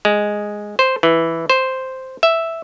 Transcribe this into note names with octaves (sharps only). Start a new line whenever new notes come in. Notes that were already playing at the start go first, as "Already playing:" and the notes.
G#3
C5
E3
C5
E5